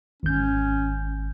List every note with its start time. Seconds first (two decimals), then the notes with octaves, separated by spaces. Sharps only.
0.23 G#1 C#4 G6